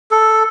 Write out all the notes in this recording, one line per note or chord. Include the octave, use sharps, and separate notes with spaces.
A4